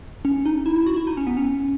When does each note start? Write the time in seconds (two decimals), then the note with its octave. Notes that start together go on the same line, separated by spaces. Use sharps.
0.25 C#4
0.46 D#4
0.66 E4
0.76 E4
0.86 F#4
0.96 E4
1.07 D#4
1.17 C#4
1.27 B3
1.37 C#4